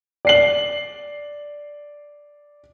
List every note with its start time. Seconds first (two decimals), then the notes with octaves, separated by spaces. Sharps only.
0.25 D5 C7 F#7